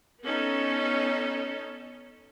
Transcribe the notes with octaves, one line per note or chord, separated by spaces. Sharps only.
B3 C#4 D#4 A4